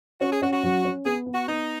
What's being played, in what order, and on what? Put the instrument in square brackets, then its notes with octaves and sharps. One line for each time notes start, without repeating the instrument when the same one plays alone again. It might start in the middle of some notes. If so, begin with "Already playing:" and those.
[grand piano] C#4 [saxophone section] F#4
[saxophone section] G#4
[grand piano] C#4 [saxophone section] F#4
[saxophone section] F#4
[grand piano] F#3
C#4
[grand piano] B3 [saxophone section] G#4
[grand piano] B3
[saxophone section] F#4
[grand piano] B3 [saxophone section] D#4